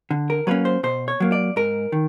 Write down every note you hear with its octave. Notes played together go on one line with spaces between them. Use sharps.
D3
A#4
F#3 A#3 C#4 B4
C5
B2 C5
C#5
F#3 A#3
D5
G#2 A#4
D#3